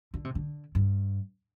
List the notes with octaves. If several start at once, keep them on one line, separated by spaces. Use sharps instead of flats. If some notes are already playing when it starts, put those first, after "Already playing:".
D3
C3
D3
G2